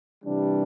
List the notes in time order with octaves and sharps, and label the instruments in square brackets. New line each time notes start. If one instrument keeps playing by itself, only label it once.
[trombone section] C3 E3 G3 D4